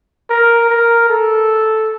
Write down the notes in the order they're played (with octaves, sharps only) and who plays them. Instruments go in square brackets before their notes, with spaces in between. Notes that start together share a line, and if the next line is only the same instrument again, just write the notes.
[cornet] A#4
A#4
A4